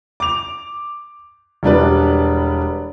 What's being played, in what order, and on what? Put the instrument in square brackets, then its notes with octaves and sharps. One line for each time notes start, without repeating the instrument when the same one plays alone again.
[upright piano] D6 F7
E1 G3 D4 B4